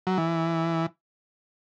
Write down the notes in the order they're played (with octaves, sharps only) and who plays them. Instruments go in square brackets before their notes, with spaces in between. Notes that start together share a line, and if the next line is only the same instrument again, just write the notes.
[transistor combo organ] F#3
E3